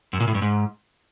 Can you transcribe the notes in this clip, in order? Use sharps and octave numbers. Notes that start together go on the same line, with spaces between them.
F#2
A#2
A2
G2
G#2